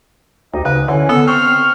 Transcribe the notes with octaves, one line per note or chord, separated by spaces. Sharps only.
D2 D#4 G4 D#5
G#2 C#3 F3 B4
D3 E3 C#4
B3 A4
C4 C#6 F6